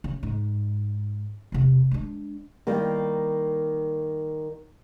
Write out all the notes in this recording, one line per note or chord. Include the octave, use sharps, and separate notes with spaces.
C#3
G#2
E1 C3
G#3 D4
D#3 G3 A#3